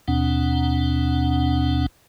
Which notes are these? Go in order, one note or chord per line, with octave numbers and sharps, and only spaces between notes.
D#2 B2 C4 D4 F#5